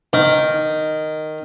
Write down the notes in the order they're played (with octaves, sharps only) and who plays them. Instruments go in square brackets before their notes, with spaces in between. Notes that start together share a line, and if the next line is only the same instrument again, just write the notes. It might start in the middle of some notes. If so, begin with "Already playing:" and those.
[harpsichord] D#3